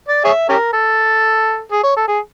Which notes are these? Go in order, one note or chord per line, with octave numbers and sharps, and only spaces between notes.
D5
G#4 C#5 E5
C#4 G4 A#4
A4
G#4
C#5
A4
G#4